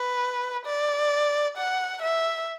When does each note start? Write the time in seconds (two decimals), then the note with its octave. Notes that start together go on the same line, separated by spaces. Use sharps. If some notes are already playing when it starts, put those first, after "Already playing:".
Already playing: B4
0.66 D5
1.57 F#5
2.02 E5